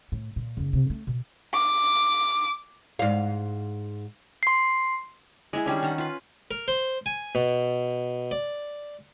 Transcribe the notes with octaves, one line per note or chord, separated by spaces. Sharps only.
A2
A#2
F#1 E2
C3
A3
B2
D6
G#2 F5
C6 C7
G#3 E4 G#4
D#3 G3 C#4 D4
D#3 F#5
F4 B4
A#4
C5
G#5
B2
D5